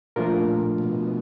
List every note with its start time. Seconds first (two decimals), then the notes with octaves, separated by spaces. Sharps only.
0.16 A#2 F3 A3 D4 F4 A#4
0.78 A#2
0.84 B2